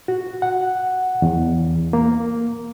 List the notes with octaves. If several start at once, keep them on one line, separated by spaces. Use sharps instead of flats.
F#4
F#5
E2
A#3